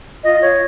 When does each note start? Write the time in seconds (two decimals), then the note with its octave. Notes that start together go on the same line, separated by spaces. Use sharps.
0.23 F4 D#5
0.42 F4 C#5